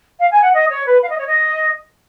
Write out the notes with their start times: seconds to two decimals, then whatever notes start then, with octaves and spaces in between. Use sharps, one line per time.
0.19 F5
0.31 G#5
0.42 F#5
0.53 D#5
0.70 C#5
0.85 B4
1.02 F5
1.10 D#5
1.17 C#5
1.25 D#5